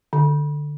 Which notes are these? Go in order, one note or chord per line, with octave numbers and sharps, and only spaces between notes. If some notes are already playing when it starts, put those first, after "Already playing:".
D3